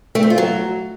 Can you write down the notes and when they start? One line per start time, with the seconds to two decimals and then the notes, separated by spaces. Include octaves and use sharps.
0.15 A3
0.23 C4
0.30 F4
0.38 F#3